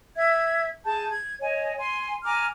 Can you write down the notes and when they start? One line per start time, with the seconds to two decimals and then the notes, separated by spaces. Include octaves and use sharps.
0.16 E5 G#6
0.86 G#4 A5 G6
1.09 G#6
1.41 C#5 D#5 G#5
1.77 G#5 C6
2.24 G#5 A#5 D6 F6